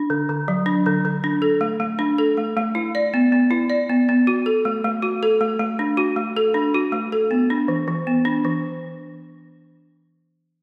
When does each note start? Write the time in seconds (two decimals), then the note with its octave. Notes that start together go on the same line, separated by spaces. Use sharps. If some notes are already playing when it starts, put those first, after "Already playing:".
Already playing: D4
0.10 D3
0.29 D3
0.48 F#3
0.66 D4
0.86 D3
1.05 D3
1.24 D4
1.42 A4
1.61 A3
1.80 A3
1.99 D4
2.18 A4
2.37 A3
2.57 A3
2.75 E4
2.95 D5
3.14 B3
3.32 B3
3.51 E4
3.70 D5
3.90 B3
4.09 B3
4.27 F#4
4.46 A4
4.65 A3
4.84 A3
5.02 F#4
5.23 A4
5.41 A3
5.59 A3
5.79 D4
5.97 F#4
6.16 A3
6.36 A4
6.54 D4
6.74 F#4
6.92 A3
7.12 A4
7.31 B3
7.50 D4
7.68 E3
7.88 E3
8.07 B3
8.25 D4
8.45 E3